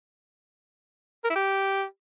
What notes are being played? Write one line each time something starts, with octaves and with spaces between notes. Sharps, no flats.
A#4
E4
G4